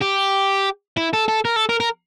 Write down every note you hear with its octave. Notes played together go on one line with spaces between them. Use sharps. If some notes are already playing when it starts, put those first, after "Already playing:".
G4
E4
A4
A4
A#4
A4
A#4
A#4